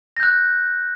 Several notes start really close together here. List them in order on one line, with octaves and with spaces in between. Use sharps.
A#6 G6 F#6